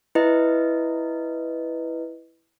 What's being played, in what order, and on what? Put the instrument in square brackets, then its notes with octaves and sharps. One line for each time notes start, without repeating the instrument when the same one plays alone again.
[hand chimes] E4 B4 D#5